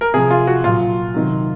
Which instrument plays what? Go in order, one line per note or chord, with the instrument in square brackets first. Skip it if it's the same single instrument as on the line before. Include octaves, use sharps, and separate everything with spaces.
[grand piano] A#4
C3 F3 G#4
F4
F#4
A#2 F#3 F4
C3 D#3 F#3